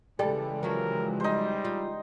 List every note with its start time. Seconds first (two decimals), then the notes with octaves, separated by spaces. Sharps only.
0.19 C#3 E3 G3 G#3 A4
0.63 F3 F#3 A#4
1.20 G3 D#4 C5
1.65 F4